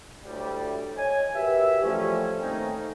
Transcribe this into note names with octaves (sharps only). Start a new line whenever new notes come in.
D2 A2 G3
C#5 D#5 G#5
F#4 G4 A#4 B4 E5
E3 F3 G3 A3 C#4
D#3 A3 A#3 C4 C#4 D#4